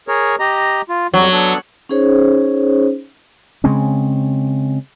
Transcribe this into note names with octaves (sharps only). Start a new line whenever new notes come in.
G#4 A#4 C#5
G4 D#5 A#5
F4
F2 F#3 G3
B3 D4 A4
C#4 D#4 G#4 C5 C#5
C#3 G#3 C4 C#4